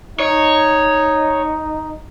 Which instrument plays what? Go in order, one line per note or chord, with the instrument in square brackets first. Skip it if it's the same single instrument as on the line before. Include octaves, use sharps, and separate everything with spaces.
[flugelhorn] D#4 [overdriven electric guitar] C#5